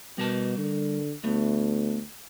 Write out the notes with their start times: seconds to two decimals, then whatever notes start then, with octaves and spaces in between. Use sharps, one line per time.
0.18 B2 G3 A#4 A5
0.58 D3
1.24 D2 A3 B3